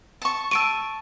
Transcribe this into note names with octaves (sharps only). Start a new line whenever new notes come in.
A5 C#6
A5 C#6 E6 D7 D#7